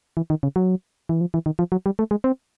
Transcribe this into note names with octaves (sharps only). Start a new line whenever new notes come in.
E3
D#3
C#3
F#3
E3
F3
E3
D#3
F3
F#3
G3
A3
G#3
C4